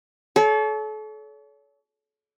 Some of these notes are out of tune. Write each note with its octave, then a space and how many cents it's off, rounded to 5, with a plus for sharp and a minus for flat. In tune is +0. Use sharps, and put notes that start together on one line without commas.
A4 -35 C#5 +35